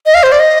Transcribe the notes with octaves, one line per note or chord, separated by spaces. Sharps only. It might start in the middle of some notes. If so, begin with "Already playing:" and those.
D#5
F5
C5
D5
D#5